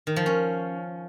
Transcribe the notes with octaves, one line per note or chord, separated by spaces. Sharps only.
D#3
F3
C#4